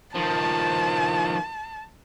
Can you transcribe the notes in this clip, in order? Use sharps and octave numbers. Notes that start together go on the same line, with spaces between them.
D#3 F3 A5